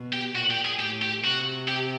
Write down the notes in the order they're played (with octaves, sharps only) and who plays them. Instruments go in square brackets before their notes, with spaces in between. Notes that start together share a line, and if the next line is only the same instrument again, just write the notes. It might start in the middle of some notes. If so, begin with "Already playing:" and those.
Already playing: [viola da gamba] B2
[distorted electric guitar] G4
[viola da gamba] A#2 [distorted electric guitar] F#4
[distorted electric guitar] G4
G#4
[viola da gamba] A2 [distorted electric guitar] G4
[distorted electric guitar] G4
[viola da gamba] C3 [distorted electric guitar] F#4
[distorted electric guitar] G4